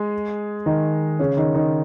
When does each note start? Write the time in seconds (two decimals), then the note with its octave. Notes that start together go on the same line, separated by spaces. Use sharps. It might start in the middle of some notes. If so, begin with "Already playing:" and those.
Already playing: G#3 G#4
0.66 D#3 D#4
1.19 C#3 C#4
1.37 D#3 D#4
1.54 D#3 D#4